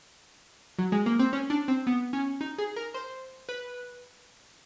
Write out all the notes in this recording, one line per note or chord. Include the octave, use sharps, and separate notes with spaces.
F#3
G#3
A#3
C4
C#4
D4
C4
B3
C#4
D#4
G#4
A#4
C5
B4